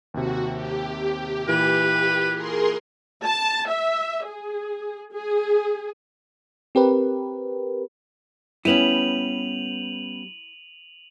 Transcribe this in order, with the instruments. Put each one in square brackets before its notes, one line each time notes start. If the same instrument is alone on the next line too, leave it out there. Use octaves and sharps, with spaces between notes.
[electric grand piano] D#2 C3 [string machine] F#4
[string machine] G4
[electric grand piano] A#2 E3 [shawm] B4
[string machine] G#4 A#4 C6
[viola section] A5
E5
G#4
G#4
[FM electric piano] C4 G4 A#4 B4
[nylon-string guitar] G3 B3 C#4 [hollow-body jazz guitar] E4 [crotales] D#7 F7 F#7